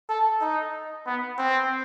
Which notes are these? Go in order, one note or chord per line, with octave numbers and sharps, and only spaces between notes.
A4
D#4
B3
C4